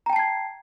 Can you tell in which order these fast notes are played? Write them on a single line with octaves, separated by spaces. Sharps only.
A#5 G5 A5 C7 G#6